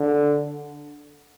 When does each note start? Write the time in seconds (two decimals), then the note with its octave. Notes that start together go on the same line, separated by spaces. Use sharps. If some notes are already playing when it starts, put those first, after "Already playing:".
Already playing: D3